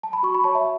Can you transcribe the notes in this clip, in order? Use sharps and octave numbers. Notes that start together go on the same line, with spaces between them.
A5
B5
F#4 C#6
B5
C#5 A5
E5